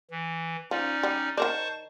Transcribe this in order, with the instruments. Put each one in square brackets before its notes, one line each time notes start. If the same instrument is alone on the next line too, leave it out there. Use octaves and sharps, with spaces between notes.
[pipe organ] E3
[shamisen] F3 [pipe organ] C#4 D#4 D5
[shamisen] G3
[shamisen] D#3 A#4 D5 [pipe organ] C5 A5 C#6